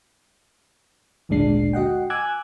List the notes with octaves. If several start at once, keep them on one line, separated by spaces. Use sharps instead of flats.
G#1 D2 A#2 G#3 D4 C7
F#4 D#5 F#5 G5
G#5 D6 E6 F#6 G#6